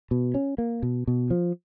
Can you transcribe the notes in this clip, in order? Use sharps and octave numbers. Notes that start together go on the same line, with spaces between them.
B2
C#4
A#3
B2
B2
F3